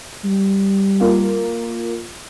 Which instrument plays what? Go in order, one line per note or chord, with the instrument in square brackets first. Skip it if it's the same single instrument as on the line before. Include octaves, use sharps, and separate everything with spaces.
[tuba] G3
[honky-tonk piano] A#3 F4